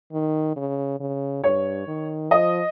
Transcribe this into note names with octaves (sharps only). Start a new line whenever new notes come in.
D#3
C#3
C#3
G2 C#5
D#3
F3 D#5